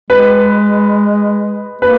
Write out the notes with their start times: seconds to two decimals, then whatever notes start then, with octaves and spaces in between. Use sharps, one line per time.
0.10 G#3 B4
1.82 A#3 B4